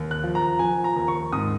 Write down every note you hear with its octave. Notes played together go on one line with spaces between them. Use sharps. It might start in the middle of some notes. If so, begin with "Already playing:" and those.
Already playing: D#2
F#6
F3
A#5
F3 G#5
A#5
D#2
C#6
G#2 D#6